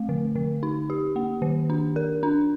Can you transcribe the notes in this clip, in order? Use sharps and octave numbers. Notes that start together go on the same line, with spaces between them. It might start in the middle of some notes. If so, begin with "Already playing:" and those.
Already playing: A3 C4
D3
D3
D#4
G4
A#3
D#3
D4
A#4
D4